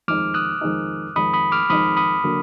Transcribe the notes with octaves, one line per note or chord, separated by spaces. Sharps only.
F2 D#3 G#3 D#4 D6 F6
D#6 F#6
F2 D#3 G#3 D#4
F2 D#3 G#3 D#4 B5 D#6
B5 D#6
D6 F6
F2 D#3 G#3 D#4 B5 D#6
B5 D#6
D3 F#3 A#3